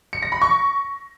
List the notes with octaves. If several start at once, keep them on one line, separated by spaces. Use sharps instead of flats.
C#7
A#6
B5
C#6